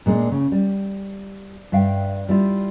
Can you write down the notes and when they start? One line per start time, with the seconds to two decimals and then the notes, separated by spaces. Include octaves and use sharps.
0.06 A#2 G#3 A#3 D4
0.32 C#3
0.52 G3
1.72 G2 E5 F5 G5
2.29 G3 E4 F4